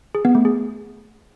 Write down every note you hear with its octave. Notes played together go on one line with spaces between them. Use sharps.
G#4
B3
A3
G#4